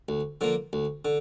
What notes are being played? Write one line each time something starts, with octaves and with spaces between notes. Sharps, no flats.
D2
D3 F3 A#3
D2
D3